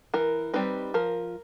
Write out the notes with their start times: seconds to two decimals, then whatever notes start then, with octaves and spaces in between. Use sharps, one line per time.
0.14 E3 A#4
0.54 G3 C4 D#4 B4
0.94 F3 A#4